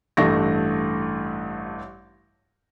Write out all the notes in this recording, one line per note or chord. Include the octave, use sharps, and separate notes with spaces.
A1 G2 A3 C#6 A#6